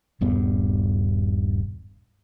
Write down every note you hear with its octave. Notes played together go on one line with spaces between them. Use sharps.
D#1 G2 B3